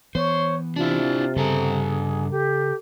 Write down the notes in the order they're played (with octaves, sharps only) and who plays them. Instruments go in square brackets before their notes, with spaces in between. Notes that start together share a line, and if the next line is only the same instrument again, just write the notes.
[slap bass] E3 B3 [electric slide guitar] C5 [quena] C#5
[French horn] C3 [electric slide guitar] D4 E4 [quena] F4
[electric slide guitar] G2 A4 A#5 [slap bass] C#3 [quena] G#4
[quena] G4 [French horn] A4